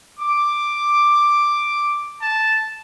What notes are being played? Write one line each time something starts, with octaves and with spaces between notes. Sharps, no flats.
D6
A5